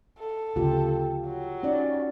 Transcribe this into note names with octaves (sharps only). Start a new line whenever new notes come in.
A4
D2 C#3 F4 G4
F#3
C#4 D#4 D5